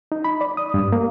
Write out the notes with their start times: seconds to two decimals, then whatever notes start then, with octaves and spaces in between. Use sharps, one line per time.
0.12 D#4
0.24 B5
0.41 D5
0.57 D#6
0.74 G2
0.92 A#3